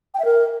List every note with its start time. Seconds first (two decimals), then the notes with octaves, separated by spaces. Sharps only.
0.14 G5
0.20 E5
0.25 A#4